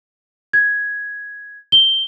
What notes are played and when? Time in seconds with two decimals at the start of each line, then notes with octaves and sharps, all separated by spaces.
0.53 G#6
1.72 G7